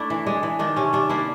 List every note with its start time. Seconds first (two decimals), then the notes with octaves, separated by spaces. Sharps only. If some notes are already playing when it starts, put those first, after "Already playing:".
Already playing: A3 D4 E4
0.10 E3
0.26 G#3 D4
0.43 E3
0.59 D#3 D4
0.76 C3 C#4
0.93 C3 D4
1.09 A#3 D4 E4